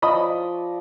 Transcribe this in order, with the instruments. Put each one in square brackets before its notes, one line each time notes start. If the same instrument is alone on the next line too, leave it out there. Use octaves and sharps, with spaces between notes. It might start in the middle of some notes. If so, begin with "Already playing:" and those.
[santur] F3 D5 C#6 [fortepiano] D#5 B5 D#6